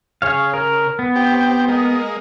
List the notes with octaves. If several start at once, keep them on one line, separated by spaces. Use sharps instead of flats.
C#3 G#4 C#5 F5
A#4
B3
C4 G4 G5
G#3 A#3 D#5